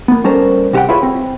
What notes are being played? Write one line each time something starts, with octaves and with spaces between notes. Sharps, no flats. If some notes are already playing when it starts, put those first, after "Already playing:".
A#3 B3
G3 C#4 A4 A#4 C5
C3 F#4 G4 F#5 G5
E4 F4 G#4 B4 C#5 E5
C4